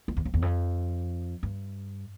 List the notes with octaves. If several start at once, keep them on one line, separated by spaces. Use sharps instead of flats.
F2
E2
F2
E2
F2
G2